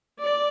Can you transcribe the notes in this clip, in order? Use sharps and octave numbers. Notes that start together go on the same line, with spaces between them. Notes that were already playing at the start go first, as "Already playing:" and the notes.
D5